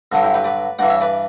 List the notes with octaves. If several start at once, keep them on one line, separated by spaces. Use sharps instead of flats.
G2 D3 F#3
E4 G4
G4 B4
B4 D5
G2 E3 D5 F#5
C#5 E5
B4 D5